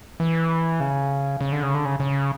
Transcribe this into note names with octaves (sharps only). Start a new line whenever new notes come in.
E3
C#3
C#3
D3
C#3
D3
C#3
C#3